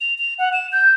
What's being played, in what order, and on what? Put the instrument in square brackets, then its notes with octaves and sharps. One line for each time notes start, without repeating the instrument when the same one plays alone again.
[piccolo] F7
F7
F#5
E7
G6